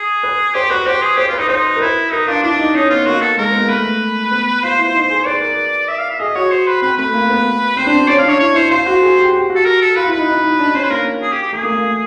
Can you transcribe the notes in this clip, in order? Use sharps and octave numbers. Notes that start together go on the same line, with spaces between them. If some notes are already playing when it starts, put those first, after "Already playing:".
Already playing: G#4
B4
G4 C5
F#4 B4
G4 C5
G#4
G4 C5
F4 B4
D#4
D#4 C5
A#4
E4 B4
D#4 A#4
D4 F4
D4 E4
D#4
C#4 D#4
B3 F4
A#3 F#4
A4
G#3 A#4
B3
A#3
A3 B4
B3
F4 C5
E4
D#4
G#4
B4 D5
A#4
E5
F5
E5
G#4 D#5
F#4 C#5
C5
B4
C4 B4
A3 B4
A#3
B3
C4 C5
D4
C#4 D5
D4 F5
C#5
E4 C#5
E4 C5
F4 C5
F#4
G#4
G4
G4
F#4
A4
A#4
A4
F4 B4
E4
B4
D#4
D#4
D#4
D4
C#4 C5
B4
A#3 A#4
G#4
G4
G4
A3 G#4
A#3
A#3
A3